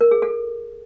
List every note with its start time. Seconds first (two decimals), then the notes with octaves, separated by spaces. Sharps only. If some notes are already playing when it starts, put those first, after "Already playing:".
0.01 A#4
0.11 G#4
0.22 A4